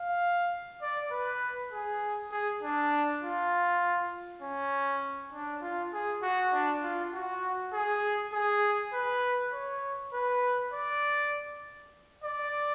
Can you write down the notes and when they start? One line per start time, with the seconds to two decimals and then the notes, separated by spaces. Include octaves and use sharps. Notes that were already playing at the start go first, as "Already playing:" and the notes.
Already playing: F5
0.82 D5
1.11 B4
1.73 G#4
2.32 G#4
2.63 D4
3.23 F4
4.42 C#4
5.33 D4
5.62 F4
5.93 G#4
6.22 F#4
6.53 D4
6.83 F4
7.13 F#4
7.73 G#4
8.33 G#4
8.93 B4
9.53 C#5
10.13 B4
10.73 D5
12.24 D5